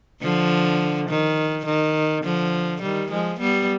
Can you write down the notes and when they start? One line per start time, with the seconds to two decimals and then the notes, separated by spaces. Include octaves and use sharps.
0.22 D3 F3
1.09 D#3
1.66 D#3
2.24 D3 F3
2.82 D#3 G3
3.11 F3 G#3
3.39 G3 B3